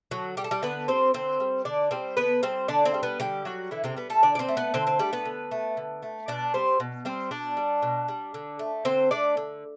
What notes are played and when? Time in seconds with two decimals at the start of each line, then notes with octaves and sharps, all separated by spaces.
0.11 D3 F#3 F#4
0.37 G3 G4
0.44 A4
0.51 G3 G4
0.62 D3 B3 B4
0.88 G3 C4 C5
1.14 D3 C4 C5
1.40 G3
1.65 D3 D4 D5
1.91 G3 C4 C5
2.17 D3 B3 B4
2.43 G3 C4 C5
2.68 D3 D4 D5
2.85 C4 C5
2.94 G3
3.03 B3 B4
3.20 D3 G3 G4
3.45 F#3 G3 F#4
3.71 D3 E3 E4
3.84 C3 C4
3.97 G3 B3
4.10 A3 A4
4.23 D3 D4 D5
4.35 D5
4.39 C4 C5
4.49 A3
4.57 B3 B4
4.74 D3 C4 C5
4.87 C4 C5
4.99 G3 A3 G4
5.13 B3 B4
5.25 D3
5.51 A3
5.77 D3
6.03 A3
6.28 B2 D4 D5
6.54 G3 C4 C5
6.80 B2
7.05 G3 C4 C5
7.31 B2 D4 D5
7.57 G3
7.82 B2
8.08 G3
8.34 D3
8.59 A3
8.85 D3 C4 C5
9.11 A3 D4 D5
9.37 D3